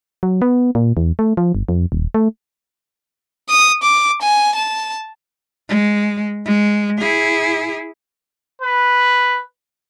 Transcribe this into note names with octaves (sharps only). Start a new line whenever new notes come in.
F#3
B3
A#2
E2
A3
F3
G1
F2
D#1
A3
D#6
D6
G#5
A5
G#3
G#3
E4 G#4
B4